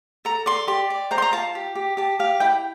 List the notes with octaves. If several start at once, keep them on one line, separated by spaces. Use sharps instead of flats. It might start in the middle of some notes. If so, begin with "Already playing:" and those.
A4 A#5
D5 C6
G4 C6
D5
C5 A#5
C6
A#5
F4 A5
G4
G4
G4 A5
G4 F5
E4 G5